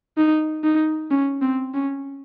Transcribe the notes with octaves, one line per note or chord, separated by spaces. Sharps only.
D#4
D#4
C#4
C4
C#4